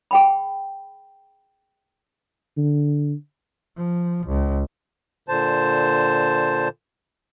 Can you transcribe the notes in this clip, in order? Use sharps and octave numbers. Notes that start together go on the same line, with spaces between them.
G#4 G5 B5
D3
F3
C#2
A#2 D3 C5 A5